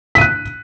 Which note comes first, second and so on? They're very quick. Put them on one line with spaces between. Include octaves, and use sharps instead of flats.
B6 D#7 F#6